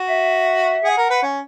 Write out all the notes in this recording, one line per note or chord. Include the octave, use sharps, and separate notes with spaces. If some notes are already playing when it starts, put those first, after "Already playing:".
Already playing: F#4
E5
G#4 F#5
A#4
B4
C#4